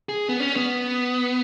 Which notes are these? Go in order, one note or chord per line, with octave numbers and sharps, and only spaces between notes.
G#4
B3
C#4
B3